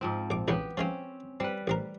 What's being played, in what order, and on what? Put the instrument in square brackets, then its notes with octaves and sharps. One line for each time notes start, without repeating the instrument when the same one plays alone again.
[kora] G#2 F3 C4
[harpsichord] A#1 D6
[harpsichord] B1 E2 C#3 [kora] B3 G4
[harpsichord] F3 G#3 F4 [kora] C4 C#4
[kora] G3 B4 [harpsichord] C4
[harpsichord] A1 C4 A#4